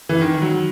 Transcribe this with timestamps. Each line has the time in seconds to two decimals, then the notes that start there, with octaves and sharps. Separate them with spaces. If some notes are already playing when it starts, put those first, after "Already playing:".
0.09 E3
0.21 D#3
0.42 F#3